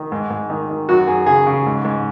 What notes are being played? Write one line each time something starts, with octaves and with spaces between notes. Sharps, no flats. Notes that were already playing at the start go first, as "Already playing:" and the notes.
Already playing: D#3
G#2
G#2
D#3
D#3
F#2 F#4
F#2 G#4
C#3 G#4
C#3
G#2
G#2